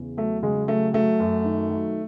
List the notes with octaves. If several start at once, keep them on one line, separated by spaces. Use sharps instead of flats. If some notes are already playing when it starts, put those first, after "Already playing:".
Already playing: E2 C#3
F#3 A3
C#3 G#3
F#3 A3
F#3 A3
F#2
D#3
F#3